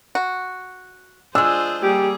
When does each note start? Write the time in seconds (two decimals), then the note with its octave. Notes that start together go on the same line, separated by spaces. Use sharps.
0.15 F#4
1.35 G#3 D4 F4 G#4 C5 E6
1.83 G3 A#3 G4 G#4